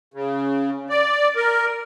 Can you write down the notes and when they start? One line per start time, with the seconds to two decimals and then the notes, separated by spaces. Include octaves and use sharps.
0.14 C#3
0.90 D5
1.36 A#4